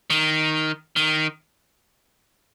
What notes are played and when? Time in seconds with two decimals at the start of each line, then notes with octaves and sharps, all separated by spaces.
0.10 D#3
0.96 D#3